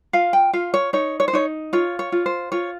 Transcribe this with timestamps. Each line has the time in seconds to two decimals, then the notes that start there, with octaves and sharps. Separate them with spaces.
0.13 F4 F5
0.33 G5
0.53 F4 F5
0.74 C#5
0.93 D#4 C#5
1.20 C#5
1.28 C5
1.33 D#4 C#5
1.73 F4 C#5
1.99 C#5
2.12 F4
2.26 C5
2.52 F4 C#5